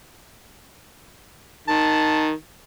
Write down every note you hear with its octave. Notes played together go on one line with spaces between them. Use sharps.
D#3 A5